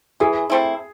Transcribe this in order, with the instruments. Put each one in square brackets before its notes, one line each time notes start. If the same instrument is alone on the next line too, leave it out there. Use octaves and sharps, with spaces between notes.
[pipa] E3 [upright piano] G#4
[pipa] A3 C4 E4